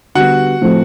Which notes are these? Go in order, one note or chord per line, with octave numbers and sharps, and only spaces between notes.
D3 G3 B3 F#4 F#5
A2 F3 A3 C4